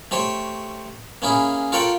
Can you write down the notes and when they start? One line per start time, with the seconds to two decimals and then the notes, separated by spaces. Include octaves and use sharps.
0.11 A3 G4 C5 C#5
1.22 A#3 C#4 E4 G#4
1.72 F4 A4 A#4 C#5 F#5 G5